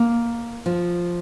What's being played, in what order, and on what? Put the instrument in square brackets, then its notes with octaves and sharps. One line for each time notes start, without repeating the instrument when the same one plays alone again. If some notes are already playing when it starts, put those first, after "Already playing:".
Already playing: [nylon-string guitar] A#3
F3